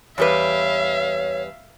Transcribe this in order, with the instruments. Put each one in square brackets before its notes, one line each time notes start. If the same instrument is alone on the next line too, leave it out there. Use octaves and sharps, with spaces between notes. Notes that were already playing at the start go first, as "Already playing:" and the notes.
[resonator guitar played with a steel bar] E2 G3 B4 [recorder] C#5 [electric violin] E5 F5